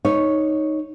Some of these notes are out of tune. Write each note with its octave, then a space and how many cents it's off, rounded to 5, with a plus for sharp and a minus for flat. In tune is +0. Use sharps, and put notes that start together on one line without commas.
D#4 +0 C#5 +0